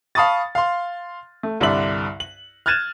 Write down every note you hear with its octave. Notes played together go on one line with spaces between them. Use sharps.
F5 A5 B5 C#6 D#6 A6
F5 C6
A3
C2 G2 D3 D5 E5 F#7
F#7
F6 F#6 G#6 A6 D#7 E7